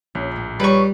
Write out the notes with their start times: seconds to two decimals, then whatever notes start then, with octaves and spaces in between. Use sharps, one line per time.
0.15 A#1 C#4
0.32 D#2 A2
0.60 G3 E4 G4 B4 C#5 C#6